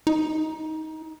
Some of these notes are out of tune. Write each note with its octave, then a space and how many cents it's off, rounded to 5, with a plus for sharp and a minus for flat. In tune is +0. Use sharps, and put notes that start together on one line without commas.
D#4 +20